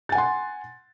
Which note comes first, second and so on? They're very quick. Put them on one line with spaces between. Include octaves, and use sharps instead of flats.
A6 G#5 F#5 C6